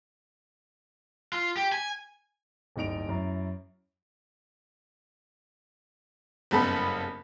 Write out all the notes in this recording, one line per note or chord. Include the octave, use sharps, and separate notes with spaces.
F4
G4
G#5
D1 G1 D#4 D7 F7
F#2 E4 A#5
F#1 G2 C#3 B3 A4 B5